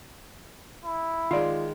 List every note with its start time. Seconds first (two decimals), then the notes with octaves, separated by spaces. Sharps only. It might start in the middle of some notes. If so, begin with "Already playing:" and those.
0.85 E4
1.31 D#3 G#3 F4 D5